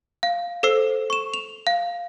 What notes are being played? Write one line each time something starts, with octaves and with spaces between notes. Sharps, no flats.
F5
A4 C5 E6 C7
C#6 E7
F7
F5